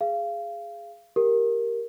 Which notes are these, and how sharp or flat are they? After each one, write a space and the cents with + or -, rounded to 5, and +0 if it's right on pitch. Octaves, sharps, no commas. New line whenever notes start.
G#4 +0 F5 -25
G4 +0 A#4 +0